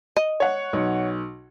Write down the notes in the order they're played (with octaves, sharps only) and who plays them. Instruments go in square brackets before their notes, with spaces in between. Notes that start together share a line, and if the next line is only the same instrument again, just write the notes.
[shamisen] D#5
[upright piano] C#5 F#5
[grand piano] B1